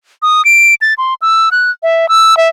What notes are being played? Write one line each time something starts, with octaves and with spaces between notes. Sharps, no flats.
D#6
D7
A6
C6
E6
F#6
E5
E6
E5